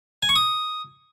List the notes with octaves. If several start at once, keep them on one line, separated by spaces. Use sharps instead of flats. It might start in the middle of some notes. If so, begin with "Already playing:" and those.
G#5
C#6
D#6